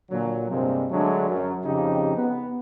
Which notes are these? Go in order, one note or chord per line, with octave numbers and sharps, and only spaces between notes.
A#2 D3 F#3
G2 C3 G3 G#3 A#3 C4
D3 F#3 G#3 A3 D4
F#2
F2 C#3 D#4 G4
B3 B4